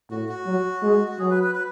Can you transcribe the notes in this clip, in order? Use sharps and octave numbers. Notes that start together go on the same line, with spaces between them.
A2 F#4
F#4
F#3
G#3
F#4
F#3 G#4
B4
B4
B4